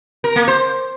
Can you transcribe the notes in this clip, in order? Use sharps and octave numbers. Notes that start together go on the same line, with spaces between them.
A#4
A#3
C5